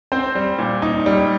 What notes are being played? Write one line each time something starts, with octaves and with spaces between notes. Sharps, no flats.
C4 C5
G3
A#2
D#4
G3